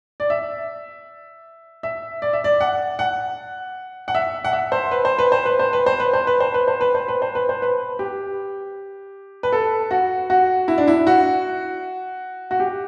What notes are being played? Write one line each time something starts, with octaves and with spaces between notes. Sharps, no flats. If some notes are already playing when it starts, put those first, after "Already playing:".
D5
E5
E5
D5
E5
D5
F#5
F#5
F#5
E5
F#5
E5
C5
B4
C5
B4
C5
B4
C5
B4
C5
B4
C5
B4
C5
B4
C5
B4
C5
B4
C5
B4
C5
B4
G4
B4
A4
F#4
F#4
E4
D4
E4
F#4
F#4
G4